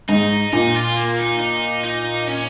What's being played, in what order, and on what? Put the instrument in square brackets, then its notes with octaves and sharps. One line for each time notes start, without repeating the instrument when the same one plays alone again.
[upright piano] G#2 [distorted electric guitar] D#4
[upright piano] A#2 [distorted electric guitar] D#4
[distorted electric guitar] F4
A#3
D#4
D#4
D#4
C#4